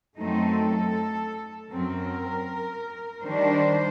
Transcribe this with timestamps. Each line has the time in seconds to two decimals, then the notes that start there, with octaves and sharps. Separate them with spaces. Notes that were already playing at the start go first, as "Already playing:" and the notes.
0.20 F#2 F#3 A3 C4 D#4 A4
1.72 F#2 F#3 C4 A#4
3.23 D#3 G3 D4 C5